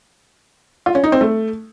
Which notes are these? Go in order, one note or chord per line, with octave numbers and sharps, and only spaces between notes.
F4
C#4
D#4
C4
A3